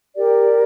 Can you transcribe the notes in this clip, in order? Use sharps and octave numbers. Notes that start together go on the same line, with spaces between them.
G4 A#4 D5